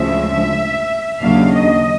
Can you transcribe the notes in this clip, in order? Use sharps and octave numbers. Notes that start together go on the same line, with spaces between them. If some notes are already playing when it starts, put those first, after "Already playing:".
Already playing: D2 C#3 F3 G#3 E5
D#2 C#3 F#3 A#3 D4 F5
D#5